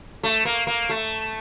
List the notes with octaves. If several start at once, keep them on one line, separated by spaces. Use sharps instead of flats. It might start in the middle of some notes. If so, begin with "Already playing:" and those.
A3
A#3
A#3
A3